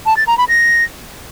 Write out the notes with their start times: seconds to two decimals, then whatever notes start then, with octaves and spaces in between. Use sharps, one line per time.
0.06 A5
0.17 A6
0.27 A#5
0.38 B5
0.48 A#6